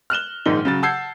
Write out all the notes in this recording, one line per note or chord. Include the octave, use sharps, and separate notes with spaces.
F6 F#6 E7 G7
A#1 G#2 D#3 D#4 G7
C#3 F#3 A6
F#5 A5 E6 G6 G#6 C7